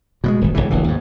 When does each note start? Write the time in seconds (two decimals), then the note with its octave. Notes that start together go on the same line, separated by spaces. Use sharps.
0.24 B2 G3 G#3
0.41 D#1 G#1
0.54 E1 C#2 C#3 E3
0.70 D1 A#1 E3
0.84 D#2 G#2